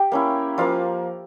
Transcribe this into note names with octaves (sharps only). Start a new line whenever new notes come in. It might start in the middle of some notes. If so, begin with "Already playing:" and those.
Already playing: G4 G5
A#3 C#4 E4
F3 A#3 F4 F5